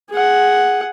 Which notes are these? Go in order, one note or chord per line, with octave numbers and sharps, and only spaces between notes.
G#4 F#5